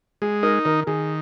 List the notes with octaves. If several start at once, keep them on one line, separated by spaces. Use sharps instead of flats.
G#3 G#4
D#4 A#4
D#3 A#4
D#3 G#4